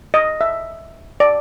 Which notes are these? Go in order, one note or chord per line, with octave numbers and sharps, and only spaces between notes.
D#5
E5
D5